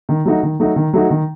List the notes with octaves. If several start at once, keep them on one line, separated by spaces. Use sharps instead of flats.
D#3
F#3 A3 D#4 F#4
D#3
F#3 A3 D#4 F#4
D#3
F#3 A3 D#4 F#4
D#3